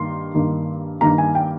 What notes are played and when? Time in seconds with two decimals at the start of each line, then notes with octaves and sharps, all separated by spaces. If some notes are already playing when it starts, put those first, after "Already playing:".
Already playing: G2 D#3 A#3 C6
0.35 G2 D#3 A#3
1.01 G2 D#3 A#3 A#5
1.18 G#5
1.35 G5